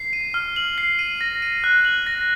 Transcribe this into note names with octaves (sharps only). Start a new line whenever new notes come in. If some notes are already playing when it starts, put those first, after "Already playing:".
Already playing: C7
D#7
F6
F#7
C7
D#7
A#6
D#7
F#6
F#7
A#6